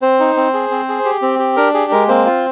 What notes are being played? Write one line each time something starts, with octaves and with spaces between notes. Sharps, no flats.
C4 C5
D#4
C4
G#4
C4
G#4
G4
C4
G4
D4 A#4
G4 G#4
G#3 A#4
A#3 C4 C5
F4